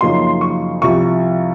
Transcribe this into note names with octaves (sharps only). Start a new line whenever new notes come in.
F#2 C#3 F3 A#3 D#4 C6
C#6
C2 C3 F3 C#6